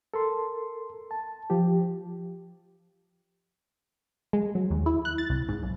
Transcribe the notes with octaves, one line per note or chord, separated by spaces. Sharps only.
A4 A#4 C6
A5
F3 G4
G#3
F#3
D#2
E4
F#6
A6
C2
G#2
B1